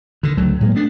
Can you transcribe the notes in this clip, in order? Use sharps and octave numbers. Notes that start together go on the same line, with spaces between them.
D3 D#3
C#2 D3 F#3 A3
A2 F#3 G#3 A#3
A3 B3 D4